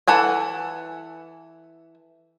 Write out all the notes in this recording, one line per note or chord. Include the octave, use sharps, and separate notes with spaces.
E3 A4 F#5 G#5